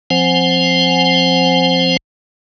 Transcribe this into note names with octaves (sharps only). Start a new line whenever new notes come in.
F3 C4 C5 F#5 G#5